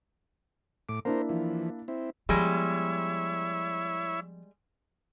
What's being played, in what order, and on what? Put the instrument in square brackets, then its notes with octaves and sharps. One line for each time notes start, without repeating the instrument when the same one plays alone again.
[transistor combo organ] A2 D6
[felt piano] A#3 D4 E4 [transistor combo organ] A#4 C5
[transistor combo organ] E3 F3
C4 E4
[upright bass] F3 B3 [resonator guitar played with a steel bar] G3 G#3 [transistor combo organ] E4 C#5 E5